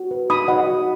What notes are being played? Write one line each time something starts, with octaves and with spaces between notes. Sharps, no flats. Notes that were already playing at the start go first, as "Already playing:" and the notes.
Already playing: F#4
B4
D#4 B5 D#6
F#4 D#5 F#5
F#4